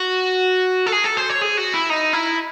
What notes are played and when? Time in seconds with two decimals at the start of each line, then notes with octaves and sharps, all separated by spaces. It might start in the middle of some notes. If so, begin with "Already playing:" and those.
Already playing: F#4
0.86 A4
0.92 G#4
1.04 A4
1.17 C5
1.29 C#5
1.41 G#4
1.57 F#4
1.74 E4
1.90 D#4
2.13 E4